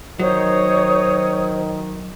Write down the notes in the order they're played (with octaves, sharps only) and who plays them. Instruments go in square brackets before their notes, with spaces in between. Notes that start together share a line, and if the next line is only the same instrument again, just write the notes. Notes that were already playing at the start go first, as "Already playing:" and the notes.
[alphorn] D#3 [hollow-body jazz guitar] F#3 [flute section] D#4 C#5 D#6 [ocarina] C5